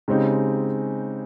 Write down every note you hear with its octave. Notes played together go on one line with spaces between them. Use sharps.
C#3 G#3 C4 D#4 G4